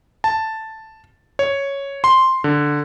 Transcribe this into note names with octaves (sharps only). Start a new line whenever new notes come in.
A5
C#5
C6
D3